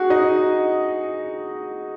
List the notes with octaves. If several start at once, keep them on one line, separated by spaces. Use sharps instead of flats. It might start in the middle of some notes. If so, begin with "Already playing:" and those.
Already playing: F#4 G#4 F#5
D#4 D#5